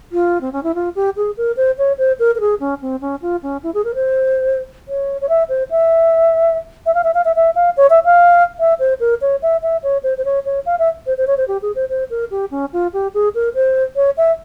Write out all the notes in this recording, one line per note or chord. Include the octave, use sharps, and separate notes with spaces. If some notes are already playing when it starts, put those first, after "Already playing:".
F4
C4
C#4
E4
F4
G4
G#4
A#4
C5
C#5
C5
A#4
A#4
G#4
C#4
C4
C#4
F4
C#4
E4
G#4
A#4
C5
C#5
C#5
E5
C5
E5
E5
F5
E5
F5
E5
E5
F5
C#5
E5
F5
E5
C5
A#4
C#5
E5
E5
C#5
C5
C5
C#5
C#5
F5
E5
C5
C5
C#5
C5
G4
G#4
C5
C5
A#4
G4
C#4
F4
G4
G#4
A#4
C5
C#5
E5